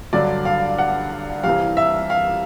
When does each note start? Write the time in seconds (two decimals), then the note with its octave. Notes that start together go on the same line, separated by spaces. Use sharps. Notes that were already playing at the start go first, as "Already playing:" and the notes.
0.13 G2 D3 F#3 D5
0.45 F5
0.78 F#5
1.44 C2 C3 E3 G3 F5
1.77 E5
2.10 F5